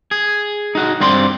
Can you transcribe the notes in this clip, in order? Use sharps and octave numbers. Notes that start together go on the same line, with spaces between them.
G#4
D#4 F#4
G2 C4 D5 C6